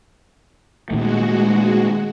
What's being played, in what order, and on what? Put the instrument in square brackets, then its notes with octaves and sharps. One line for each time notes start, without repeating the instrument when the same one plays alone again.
[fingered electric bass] A#2 D#3 A3 [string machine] G#3 F#4